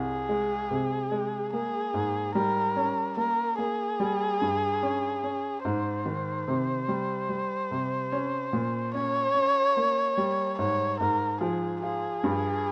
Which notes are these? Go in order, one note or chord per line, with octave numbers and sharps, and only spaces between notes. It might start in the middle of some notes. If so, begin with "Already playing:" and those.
Already playing: C2 G#4
G#3
C3
G#3
A#3 G#4
G#2
G3 A#4
C#4
A#3 A#4
A#3 G#4
G3
G2
C#4
C#4
G#2 C5
D#3
C3
G3
G3
C3
C#4
A#2
C#4 C#5
C#4
A#3
G3
G#2 C#5
G#2 A#4
F3 G#4
F4 G#4
G2